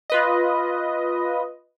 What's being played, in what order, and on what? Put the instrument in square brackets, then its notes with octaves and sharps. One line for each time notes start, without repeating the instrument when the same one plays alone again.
[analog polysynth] F4 B4 D#5